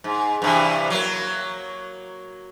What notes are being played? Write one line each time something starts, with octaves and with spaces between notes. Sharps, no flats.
G#2
G2 C3 E3
F#3 A#3